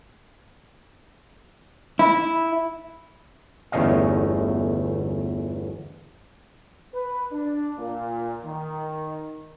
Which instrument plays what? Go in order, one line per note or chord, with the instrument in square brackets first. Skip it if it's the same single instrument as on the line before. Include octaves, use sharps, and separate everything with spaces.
[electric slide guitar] E4
[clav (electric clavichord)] G1 E2 A3 C#4 D#5 F5
[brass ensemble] B4
D4
A#2
D#3